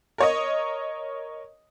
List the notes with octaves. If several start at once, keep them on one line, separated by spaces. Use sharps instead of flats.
A#4 C#5 D#5